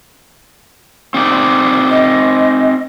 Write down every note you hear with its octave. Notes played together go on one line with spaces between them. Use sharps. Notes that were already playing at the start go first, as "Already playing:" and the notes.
C4 D#4 D5
D#5